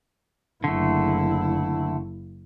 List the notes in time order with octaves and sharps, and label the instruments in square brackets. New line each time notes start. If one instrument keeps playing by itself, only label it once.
[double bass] F#1 E4 [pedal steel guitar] D3 A3